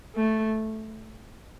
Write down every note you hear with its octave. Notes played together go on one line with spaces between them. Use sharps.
A3